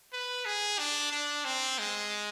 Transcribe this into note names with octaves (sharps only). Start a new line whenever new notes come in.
B4
G#4
D4
D4
C4
G#3